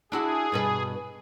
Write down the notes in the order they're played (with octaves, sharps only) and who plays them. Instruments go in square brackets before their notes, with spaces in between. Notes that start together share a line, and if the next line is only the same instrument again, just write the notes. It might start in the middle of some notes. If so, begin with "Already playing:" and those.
[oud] D4 E4 F#4 [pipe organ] G#4
[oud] G2 B2 B4